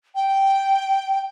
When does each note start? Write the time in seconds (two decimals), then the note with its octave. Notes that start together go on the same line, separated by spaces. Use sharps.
0.15 G5